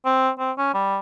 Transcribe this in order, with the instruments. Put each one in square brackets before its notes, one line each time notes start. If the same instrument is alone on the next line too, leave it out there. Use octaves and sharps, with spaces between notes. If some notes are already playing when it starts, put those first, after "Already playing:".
[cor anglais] C4
C4
C#4
G3